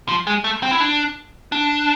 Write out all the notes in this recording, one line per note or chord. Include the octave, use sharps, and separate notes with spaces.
F3
G#3
A3
C4
E4
D4
D4